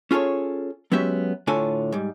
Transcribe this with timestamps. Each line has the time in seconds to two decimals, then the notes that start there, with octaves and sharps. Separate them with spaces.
0.11 C#4 F4 G#4 A4 C#5
0.92 F#3 G#3 B3 C#4 G4 E5
1.47 A2 D3 F4 A4 C#5 G#5
1.92 G#2 G3